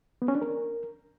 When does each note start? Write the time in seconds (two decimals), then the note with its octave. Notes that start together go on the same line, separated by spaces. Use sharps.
0.22 B3
0.28 C#4
0.35 D4
0.42 A#4